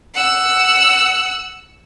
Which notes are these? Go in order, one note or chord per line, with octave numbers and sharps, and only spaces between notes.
F#5 E6